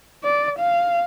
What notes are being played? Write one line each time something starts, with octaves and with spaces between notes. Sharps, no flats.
D5
F5